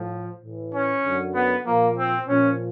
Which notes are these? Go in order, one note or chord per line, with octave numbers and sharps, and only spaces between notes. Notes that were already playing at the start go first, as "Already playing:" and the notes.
Already playing: A2 F3
A2 E3
C#4
F#2 D3 F#3
B3
A#2 F3 A#3
C4
A#2 F3 C#4